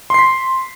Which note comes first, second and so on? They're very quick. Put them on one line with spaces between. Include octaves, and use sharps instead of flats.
C6 C7 B6